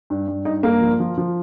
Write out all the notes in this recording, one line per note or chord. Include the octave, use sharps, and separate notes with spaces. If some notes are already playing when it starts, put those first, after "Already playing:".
G2
G2
G2 D#4
G2 A#3
F3
F3
F3